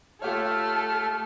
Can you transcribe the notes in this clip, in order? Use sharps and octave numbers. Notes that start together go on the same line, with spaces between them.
A3 F4 G4 A4 C#5 F6